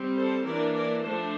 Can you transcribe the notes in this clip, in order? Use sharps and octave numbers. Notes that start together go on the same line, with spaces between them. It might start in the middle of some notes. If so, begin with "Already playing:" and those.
Already playing: G3 C4
A4 C5
E3 A#3 D4 A#4 D5
A#4 D5
F3 A3 D4 A4 C5